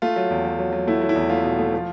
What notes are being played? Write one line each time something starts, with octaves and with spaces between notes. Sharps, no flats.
A3 F4
F#3
E2
F#3
F#3
F#3
A3 E4
F#3
E4
E2
A3 F4
B2
A3
F3